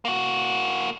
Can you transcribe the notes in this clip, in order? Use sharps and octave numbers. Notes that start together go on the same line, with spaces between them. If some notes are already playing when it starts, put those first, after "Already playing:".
A#3 F#4